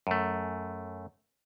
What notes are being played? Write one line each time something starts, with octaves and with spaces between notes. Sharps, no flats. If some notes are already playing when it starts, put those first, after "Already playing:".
F#2 A3